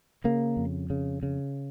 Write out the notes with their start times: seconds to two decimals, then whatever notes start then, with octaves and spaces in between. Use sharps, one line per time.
0.24 C#3 A#3
0.57 F2
0.90 C#3
1.23 C#3